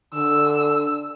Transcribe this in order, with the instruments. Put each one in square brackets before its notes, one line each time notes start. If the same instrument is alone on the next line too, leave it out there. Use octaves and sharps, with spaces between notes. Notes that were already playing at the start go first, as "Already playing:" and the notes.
[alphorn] D3 [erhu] E6